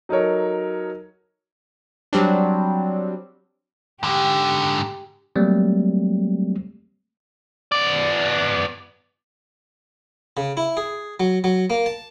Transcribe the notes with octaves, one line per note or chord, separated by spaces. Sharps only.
F#3 D#4 A4 A#4 C#5
F#3 G3 C4 D4
G#2 D3 G4
F#3 G3 A3 A#3 C4
B3 D5
C#3
E4
G#4
F#3
F#3
A#3
A5